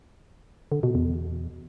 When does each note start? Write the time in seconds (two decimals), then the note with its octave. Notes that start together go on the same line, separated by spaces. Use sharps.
0.72 D3
0.83 B2
0.95 E2